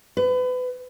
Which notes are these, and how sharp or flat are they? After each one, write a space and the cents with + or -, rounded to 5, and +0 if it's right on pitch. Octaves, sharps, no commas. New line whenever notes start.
B4 +30